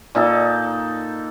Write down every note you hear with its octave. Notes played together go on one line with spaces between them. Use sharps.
A#2 D#4 A4